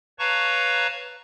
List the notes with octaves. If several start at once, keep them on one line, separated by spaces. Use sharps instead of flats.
B4 C#5 F5 A5 A#5 C#6